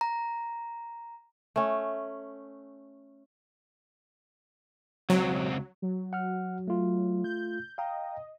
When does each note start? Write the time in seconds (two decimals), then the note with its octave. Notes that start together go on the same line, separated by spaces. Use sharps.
0.01 A#5
1.56 A3 C#4
5.10 C#2 F#3 C4
5.82 F#3
6.13 F#5 F6
6.68 A3 F4
7.24 G6
7.78 D#5 F5 G5 A#5